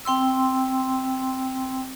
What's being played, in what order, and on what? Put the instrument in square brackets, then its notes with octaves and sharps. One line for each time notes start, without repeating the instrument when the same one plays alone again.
[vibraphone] C4 G5 C6 E6